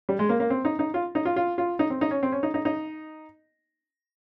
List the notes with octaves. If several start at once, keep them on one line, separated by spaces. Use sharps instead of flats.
G3
G#3
A#3
A#3
C4
D#4
D#4
F4
D#4
F4
F4
F4
D#4
C4
D#4
C#4
C4
C#4
D#4
D#4
D#4